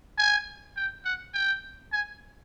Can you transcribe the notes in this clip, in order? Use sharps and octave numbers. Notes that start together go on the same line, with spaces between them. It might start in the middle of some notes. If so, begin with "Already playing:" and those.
G#5
G5
F#5
G5
G#5